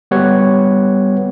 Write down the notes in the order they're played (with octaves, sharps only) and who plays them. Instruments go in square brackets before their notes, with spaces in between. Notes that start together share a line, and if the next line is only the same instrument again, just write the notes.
[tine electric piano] G3 B3 G4 B4 C#5